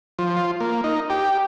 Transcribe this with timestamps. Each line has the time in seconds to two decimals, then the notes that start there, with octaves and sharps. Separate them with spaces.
0.19 F3
0.37 F4
0.60 A#3
0.84 D#4
1.10 G4